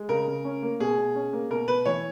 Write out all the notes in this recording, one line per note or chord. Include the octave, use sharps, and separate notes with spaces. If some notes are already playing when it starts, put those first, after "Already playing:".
Already playing: G#3
C#3 A#4
C#3
C#4
A#3
B2 G#4
B2
C#4
A#3
B2 A#4
B2 B4
E3 C#5